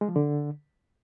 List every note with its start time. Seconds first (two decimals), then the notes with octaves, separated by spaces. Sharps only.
0.01 G#3
0.08 F3
0.16 D3